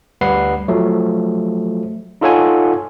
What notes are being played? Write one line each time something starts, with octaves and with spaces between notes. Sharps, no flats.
D2 G3 B4 F#5 C7
F3 F#3 A3
D#4 F4 A4 C#5 F#5 G#5